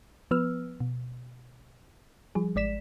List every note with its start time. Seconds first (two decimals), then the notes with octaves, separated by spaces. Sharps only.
0.31 F3 B3 B4 E6 F6
0.80 B2
2.35 F3 G3 G#4
2.55 G#1 G#3 D5 B6 E7